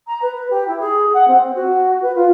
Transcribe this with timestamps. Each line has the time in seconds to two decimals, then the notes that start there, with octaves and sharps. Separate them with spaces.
0.07 A#5
0.22 B4
0.35 B4
0.50 G4
0.68 E4
0.80 G#4
1.13 F#5
1.27 C4
1.55 F#4
2.02 B4
2.15 F4